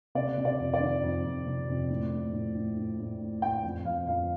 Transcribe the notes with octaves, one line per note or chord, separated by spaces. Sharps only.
C3 D5
C3
D5
F2
D5
D#3
F2
F2
C3
F2
A2
A2
A2
A2
A2
A2
A2
A2 G5
F2
F2 F5
F2 F5